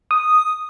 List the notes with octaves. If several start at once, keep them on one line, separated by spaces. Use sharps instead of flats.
D#6